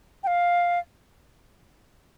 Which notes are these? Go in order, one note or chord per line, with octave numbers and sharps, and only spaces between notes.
G5
F5